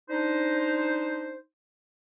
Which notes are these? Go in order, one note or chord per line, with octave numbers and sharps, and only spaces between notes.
D4 D#4 C5